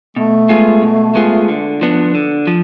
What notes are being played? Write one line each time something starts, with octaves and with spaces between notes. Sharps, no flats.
B2 A3
G#3 B3 F4 G#4
B2
G#3 B3 F4 G#4
D3
F3 B3 D4
D3
F3